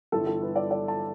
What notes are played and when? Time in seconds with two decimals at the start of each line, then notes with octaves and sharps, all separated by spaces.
0.12 G1 G2 E3 A4
0.27 A4
0.42 B4
0.56 D5
0.71 D5
0.88 A5